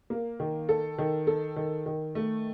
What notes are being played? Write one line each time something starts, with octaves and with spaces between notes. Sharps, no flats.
A#3
D#3
A4
D#3
A4
D#3
D#3
A3